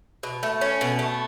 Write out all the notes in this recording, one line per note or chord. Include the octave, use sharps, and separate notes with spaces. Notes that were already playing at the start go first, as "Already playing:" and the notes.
B2
A3
C#4
B2
A3